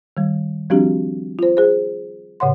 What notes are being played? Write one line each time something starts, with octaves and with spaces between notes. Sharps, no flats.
D#3 G3
F3 G3 C4 D4 F#4 G4
F4 C5
G#4 C5
A2 C#3 C#5 F#5 C6